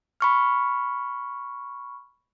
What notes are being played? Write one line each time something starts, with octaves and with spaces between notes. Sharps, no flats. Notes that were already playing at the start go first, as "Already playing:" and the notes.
B5 C#6 F6